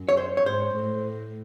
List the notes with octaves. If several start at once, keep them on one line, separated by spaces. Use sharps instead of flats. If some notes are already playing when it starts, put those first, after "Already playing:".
Already playing: F#2
C#5
C5
C#5
G#2 C5
A2